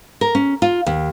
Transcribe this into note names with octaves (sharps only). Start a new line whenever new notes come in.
A#4
C#4
F4
D#2